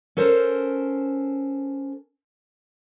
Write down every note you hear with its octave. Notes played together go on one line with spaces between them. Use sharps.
C#4 A4 A#4 C5